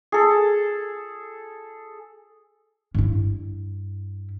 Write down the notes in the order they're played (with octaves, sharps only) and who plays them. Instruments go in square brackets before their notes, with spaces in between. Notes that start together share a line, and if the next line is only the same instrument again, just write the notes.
[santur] G#4 A4
[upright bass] G2 E4